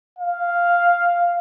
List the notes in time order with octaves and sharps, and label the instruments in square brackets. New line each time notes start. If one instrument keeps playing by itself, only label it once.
[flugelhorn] F5